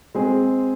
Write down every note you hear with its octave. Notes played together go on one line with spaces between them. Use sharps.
G#3 C4 G#4